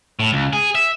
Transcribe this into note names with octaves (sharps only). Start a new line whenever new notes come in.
A2
C#2
G#4
E5